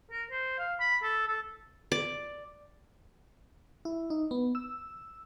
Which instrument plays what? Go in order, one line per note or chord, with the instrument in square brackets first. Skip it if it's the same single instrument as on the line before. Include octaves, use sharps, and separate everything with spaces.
[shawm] A#4
C5
F5
B5
A4
A4
[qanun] D5
[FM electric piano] E4
D#4
B3
E6